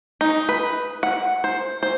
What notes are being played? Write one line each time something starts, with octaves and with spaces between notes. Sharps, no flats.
D#4
B4
F#5
C5
C5